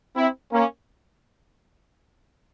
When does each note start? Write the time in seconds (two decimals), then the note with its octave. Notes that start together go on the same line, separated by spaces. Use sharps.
0.16 C4 E4
0.53 A#3 C#4